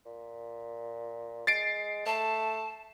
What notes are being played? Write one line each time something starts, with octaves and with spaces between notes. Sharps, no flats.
A#2
G#3 A6 C7 D7
A3 A5